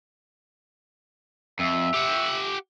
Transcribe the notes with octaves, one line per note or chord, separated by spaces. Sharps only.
F2 E5
G4 F#5